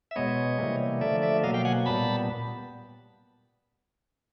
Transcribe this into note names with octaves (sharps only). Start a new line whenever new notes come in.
E5
B2 G#3 B3 C#5 D#5
C3 E3 G3 A#3
D3 F3 A3 D5 E5
D5 E5
B2 F#3 A#3 D#5 F5
F5 G5
F#5 G#5
A#2 G3 B3 A5 B5